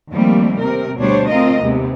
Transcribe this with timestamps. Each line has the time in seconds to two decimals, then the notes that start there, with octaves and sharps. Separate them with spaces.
0.11 D#2 F3 G3 A3 A#3 C4
0.59 C3 C4 A#4
0.98 D2 B2 G3 D4 C5 C#5
1.29 D2 A3 C4 F4 A#4 D#5
1.60 D#2 C3 G#3 B3